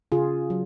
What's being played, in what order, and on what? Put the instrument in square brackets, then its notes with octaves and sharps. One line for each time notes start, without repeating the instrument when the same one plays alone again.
[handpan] C#3 F4 G#4
F#3